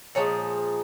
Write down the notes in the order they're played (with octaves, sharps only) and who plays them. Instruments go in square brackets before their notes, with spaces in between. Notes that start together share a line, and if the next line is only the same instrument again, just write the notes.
[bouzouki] A#2 F3 G#3 C#5